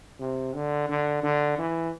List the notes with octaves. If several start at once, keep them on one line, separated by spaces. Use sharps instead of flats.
C3
D3
D3
D3
E3